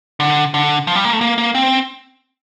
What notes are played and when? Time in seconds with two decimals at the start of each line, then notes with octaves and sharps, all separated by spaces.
0.20 D3
0.54 D3
0.87 F3
0.95 G3
1.04 A#3
1.13 A3
1.21 A#3
1.38 A#3
1.55 C4